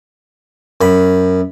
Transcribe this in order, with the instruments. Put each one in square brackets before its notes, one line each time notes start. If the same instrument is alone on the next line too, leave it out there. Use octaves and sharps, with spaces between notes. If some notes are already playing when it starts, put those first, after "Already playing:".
[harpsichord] F#2 B5